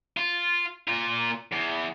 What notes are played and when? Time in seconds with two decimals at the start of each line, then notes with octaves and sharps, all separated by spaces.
0.17 F4
0.88 A#2 F4
1.52 E2